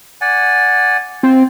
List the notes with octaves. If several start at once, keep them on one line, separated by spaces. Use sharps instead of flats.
D5 F#5 G#5
C4 F4